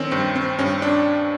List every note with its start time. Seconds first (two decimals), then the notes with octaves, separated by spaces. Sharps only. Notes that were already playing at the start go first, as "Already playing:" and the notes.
Already playing: D#3 C4 C#4
0.12 G2 C4
0.36 C4
0.59 G2 C#4
0.82 D4